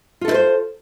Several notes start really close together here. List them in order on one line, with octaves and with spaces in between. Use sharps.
F4 A4 E4 B4 C5